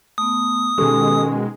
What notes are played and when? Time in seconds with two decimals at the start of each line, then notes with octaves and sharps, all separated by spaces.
0.18 A3 B3 D#6
0.78 B2 D#3 G#3 C#4 G4 A4 G#5